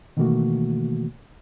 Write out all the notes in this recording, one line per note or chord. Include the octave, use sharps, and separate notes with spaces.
B2 D#3 E3 A3 A#3 F#4